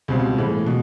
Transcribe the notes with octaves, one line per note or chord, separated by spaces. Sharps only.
C#2 B2 G3 C4
A2 E3 G#3
B2